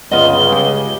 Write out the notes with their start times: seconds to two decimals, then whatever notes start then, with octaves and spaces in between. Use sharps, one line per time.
0.12 G1 C#2 C#3 B3 F4 D#5 G7
0.52 G#3 G4